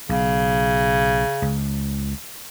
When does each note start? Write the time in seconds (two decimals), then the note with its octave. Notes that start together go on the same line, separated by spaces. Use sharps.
0.09 B1 C#3
1.42 C#2